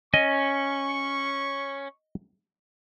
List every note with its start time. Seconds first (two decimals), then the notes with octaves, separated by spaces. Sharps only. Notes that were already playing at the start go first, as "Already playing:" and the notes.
0.14 C#4 D#5 C#6